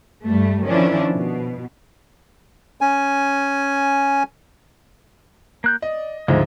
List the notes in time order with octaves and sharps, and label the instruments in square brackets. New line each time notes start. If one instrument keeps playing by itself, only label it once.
[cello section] G2 G3 A3
D#3 F3 C#4 D4 E4
B2
[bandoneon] C#4 G#5
[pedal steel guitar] A#3 F#6 G6
[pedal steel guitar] D5 [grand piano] D#5
[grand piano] D2 G#2 F3 [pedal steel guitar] G#3 D#5